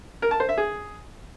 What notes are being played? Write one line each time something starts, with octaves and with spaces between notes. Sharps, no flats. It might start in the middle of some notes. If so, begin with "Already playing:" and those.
A#4
A5
C5
E5
G#4